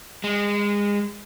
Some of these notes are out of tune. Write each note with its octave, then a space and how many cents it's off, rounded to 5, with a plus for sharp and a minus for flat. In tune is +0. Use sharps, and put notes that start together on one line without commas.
G#3 -25